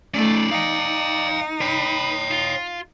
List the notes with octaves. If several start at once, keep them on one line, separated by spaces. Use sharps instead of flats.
A3 C#4 D#4 D5
D#4 F5 G5
B4 C#5 G5
F4